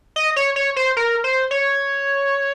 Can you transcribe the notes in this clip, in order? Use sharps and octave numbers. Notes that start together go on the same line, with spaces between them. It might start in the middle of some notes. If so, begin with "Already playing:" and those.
D#5
C#5
C#5
C5
A#4
C5
C#5